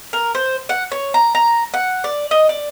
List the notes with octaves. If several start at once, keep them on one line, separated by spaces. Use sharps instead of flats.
A#4
C5
F#5
C#5
A#5
A#5
F#5
D5
D#5
D5